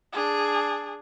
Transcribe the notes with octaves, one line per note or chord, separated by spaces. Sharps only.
D4 G#4